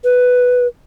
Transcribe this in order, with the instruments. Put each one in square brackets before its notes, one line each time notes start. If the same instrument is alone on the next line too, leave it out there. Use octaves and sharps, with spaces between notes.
[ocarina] B4